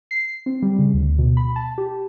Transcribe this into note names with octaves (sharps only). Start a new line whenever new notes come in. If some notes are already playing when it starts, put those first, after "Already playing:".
C7
C4
G3
C#3
D2
B2
B5
A5
G4